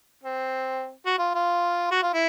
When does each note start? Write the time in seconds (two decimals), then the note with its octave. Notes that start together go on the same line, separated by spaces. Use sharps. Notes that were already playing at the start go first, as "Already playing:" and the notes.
0.24 C4
1.06 F#4
1.18 F4
1.35 F4
1.91 F#4
2.03 F4
2.13 E4